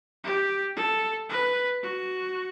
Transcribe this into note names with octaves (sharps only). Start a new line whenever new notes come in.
G4
A4
B4
F#4